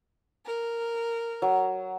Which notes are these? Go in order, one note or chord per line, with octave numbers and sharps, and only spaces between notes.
A#4
F#3